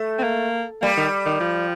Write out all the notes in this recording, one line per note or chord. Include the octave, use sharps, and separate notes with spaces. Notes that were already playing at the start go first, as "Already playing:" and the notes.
Already playing: A3
C4
A#3
G3 A#3
D#3
D#3
F3